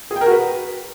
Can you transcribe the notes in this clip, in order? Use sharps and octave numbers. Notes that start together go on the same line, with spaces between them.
G#4
G5
A#4
F#4
B4